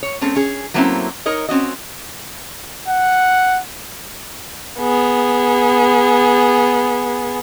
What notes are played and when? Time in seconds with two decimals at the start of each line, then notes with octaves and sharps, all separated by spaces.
0.03 C#5
0.21 A3 C4 C#4 G#4
0.36 C#4 G#4
0.74 F#3 A3 A#3 C4 C#4 E4
1.26 D#4 A#4 C#5 D#5
1.49 C4 C#4 F#4 D#5
2.88 F#5
4.80 B3 G#4